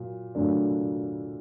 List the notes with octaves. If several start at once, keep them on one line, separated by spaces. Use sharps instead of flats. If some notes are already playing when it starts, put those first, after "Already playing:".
Already playing: A#2 F#3
A#2 D3 F#3 A3 D4